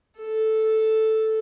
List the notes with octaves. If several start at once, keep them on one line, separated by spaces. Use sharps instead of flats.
A4